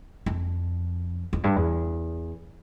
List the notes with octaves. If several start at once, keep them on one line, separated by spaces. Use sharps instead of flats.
F2
F2
G2
E2